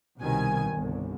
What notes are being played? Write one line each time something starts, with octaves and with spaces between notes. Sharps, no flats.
C2 B2 D#3 G#5
G1 C2 D3